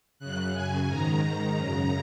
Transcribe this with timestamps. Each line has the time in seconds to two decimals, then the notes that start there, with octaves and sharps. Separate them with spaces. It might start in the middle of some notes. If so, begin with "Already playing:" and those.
0.19 F#2 C#3 F#6
0.54 G#5
0.89 G#2 D#3 A#5
1.58 F#2 C#3